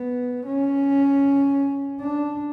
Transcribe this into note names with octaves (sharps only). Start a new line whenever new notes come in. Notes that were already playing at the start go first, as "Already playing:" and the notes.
Already playing: B3
C#4
D4